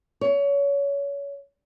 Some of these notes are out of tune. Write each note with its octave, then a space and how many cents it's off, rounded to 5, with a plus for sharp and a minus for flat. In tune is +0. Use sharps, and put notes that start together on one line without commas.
C#5 +25